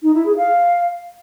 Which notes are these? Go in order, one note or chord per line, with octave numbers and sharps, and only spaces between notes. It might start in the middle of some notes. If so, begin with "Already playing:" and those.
D#4
E4
G#4
F5